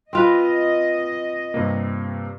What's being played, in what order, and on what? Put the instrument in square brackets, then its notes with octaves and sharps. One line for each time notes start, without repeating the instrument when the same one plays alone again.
[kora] C4 F4 B4 [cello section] D#5
[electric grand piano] G2 C3 A#3